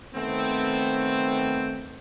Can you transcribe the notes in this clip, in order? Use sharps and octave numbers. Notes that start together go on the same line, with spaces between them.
D#3 A3 B3 C4